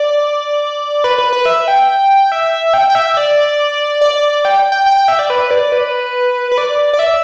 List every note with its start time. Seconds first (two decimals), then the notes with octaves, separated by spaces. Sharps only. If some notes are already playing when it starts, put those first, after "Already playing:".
Already playing: D5
1.04 B4
1.18 B4
1.33 B4
1.46 E5
1.68 G5
2.32 E5
2.74 G5
2.90 G5
2.95 E5
3.17 D5
4.01 D5
4.45 G5
4.72 G5
4.86 G5
4.97 G5
5.08 E5
5.19 D5
5.30 B4
5.51 D5
5.72 B4
6.52 B4
6.58 D5
6.93 D5
6.99 E5